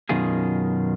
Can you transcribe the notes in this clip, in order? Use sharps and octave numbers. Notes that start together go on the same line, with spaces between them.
F#2 B2 D#3 F4 G#4